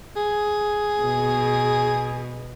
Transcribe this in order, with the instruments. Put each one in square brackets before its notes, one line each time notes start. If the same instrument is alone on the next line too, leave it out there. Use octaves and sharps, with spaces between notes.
[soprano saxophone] G#4
[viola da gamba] B2